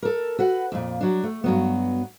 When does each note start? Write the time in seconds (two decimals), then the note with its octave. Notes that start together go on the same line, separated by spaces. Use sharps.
0.03 A4 A#4
0.39 F#4 B4 F#5
0.72 F2 A#2
1.01 F#3 D4
1.23 A3
1.44 G2 F#3 B3